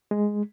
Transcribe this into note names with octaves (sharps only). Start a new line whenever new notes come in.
G#3